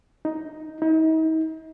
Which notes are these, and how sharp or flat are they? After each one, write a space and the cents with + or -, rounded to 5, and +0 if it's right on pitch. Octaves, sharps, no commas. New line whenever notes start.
D#4 +5
D#4 +40